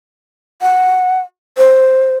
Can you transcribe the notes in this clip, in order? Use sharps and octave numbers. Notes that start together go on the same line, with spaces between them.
F#5
C5